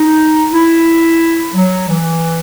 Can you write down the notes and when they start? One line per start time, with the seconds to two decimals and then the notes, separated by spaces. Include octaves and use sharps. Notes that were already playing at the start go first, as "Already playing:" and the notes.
Already playing: D#4
0.52 E4
1.54 F#3
1.89 E3